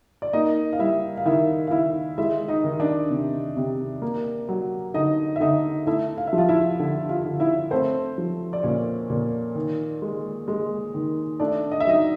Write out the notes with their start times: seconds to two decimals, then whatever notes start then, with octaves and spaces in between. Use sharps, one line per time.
0.22 D5
0.33 A#3 D#4 D#5
0.73 F5
0.79 G3 E4 E5
1.17 F5
1.25 D#3 E4 E5
1.67 F5
1.71 D#3 E4 E5
2.18 G#3 E4 E5
2.48 D#4 D#5
2.64 D#3
2.80 D4 D5
3.10 C3
3.57 C3
4.02 A#3
4.49 F#3
4.94 D3 D#4 D#5
5.36 E5
5.40 D3 D#4 D#5
5.86 A3 E4 E5
6.18 F5
6.27 E5
6.33 F3
6.38 F4 F5
6.49 E4 E5
6.79 D3
7.09 F4 F5
7.25 D3
7.40 E4 E5
7.71 A3 C4 C5
8.18 F3
8.53 D5
8.63 A#2 C#4 C#5
9.10 A#2
9.55 D#3
10.02 G#3
10.48 G#3
10.94 D#3
11.40 A3 D4 D5
11.72 D#5
11.80 E5
11.86 F#3 D#4 D#5